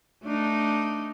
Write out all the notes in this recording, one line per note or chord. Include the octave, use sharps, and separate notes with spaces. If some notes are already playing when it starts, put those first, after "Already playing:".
A3 D4 D#4